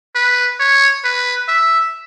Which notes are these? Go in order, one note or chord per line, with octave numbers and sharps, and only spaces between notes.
B4
C#5
B4
E5